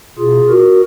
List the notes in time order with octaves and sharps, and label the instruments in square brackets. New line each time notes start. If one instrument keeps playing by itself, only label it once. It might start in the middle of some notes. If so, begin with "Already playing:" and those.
[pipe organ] B2 F4 G#4
F#4 A#4